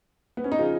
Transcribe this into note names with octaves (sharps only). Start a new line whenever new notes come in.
B3
C#4
D#4
C#3 F3 F4